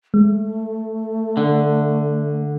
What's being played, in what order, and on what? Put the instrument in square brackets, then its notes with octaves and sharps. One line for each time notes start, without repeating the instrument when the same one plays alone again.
[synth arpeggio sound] G#3 [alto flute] A3
[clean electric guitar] D3